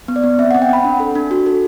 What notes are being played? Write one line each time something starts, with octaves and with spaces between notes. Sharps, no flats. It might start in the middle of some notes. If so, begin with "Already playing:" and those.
B3
D5
B3
C4 E5
F#5
C4
G5
C4 B5
D4
A4
D4
F#4
A4